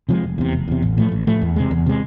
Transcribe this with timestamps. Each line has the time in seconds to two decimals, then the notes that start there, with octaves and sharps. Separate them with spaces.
0.09 C3 F3 G#3
0.23 F1
0.38 E2 C3
0.53 F1
0.68 E2 C3
0.82 A1
0.98 A2 F3 A3
1.12 A1
1.27 A2 F3 A3
1.42 E2
1.56 C3 G#3
1.71 E2
1.86 C3 G#3